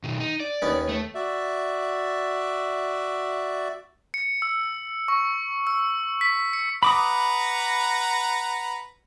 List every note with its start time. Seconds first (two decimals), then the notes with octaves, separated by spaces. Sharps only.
0.04 B2 D#3
0.20 D#4
0.40 D5
0.62 D#2 B3 C#4
0.89 A3
1.15 F#4 D5 E5
4.14 C#7
4.42 E6
5.08 C#6
5.67 E6
6.21 B6
6.53 C#7
6.83 B4 F#5 A#5 B5 D6 D#6